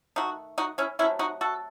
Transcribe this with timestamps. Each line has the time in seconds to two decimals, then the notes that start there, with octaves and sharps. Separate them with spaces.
0.16 D#3 A3 D#4 F#4
0.58 D#4 F#4
0.78 C#4 E4
0.99 C3 F#3 A3 C#4 E4
1.19 D#4 F#4
1.41 F#4 A4